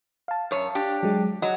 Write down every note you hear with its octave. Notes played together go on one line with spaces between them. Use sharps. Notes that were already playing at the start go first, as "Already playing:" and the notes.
F5 A5
F#2 C#5
D4 G4
F#3 G#3
F#3 D#5